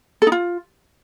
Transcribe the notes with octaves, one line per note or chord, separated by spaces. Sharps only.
A4
D#4
F4